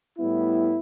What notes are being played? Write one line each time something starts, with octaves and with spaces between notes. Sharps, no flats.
A2 G3 B3 E4